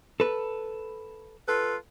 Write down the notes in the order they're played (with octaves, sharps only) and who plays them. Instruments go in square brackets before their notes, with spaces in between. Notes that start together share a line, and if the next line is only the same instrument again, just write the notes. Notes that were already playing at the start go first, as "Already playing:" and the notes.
[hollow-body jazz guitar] A4 B4
[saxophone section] F4 A4 B4